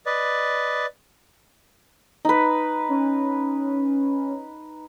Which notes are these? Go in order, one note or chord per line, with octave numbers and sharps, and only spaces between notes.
B4 D5 D#5
D#4 B4
C#4